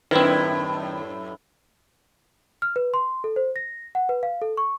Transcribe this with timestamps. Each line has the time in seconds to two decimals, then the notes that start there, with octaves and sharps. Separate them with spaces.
0.11 F#2 A2 D#3 C4 E4 B4
2.62 F6
2.76 B4
2.94 C6
3.24 A4
3.36 C5
3.56 A#6
3.95 F#5
4.09 B4
4.23 F5
4.42 A4
4.57 C#6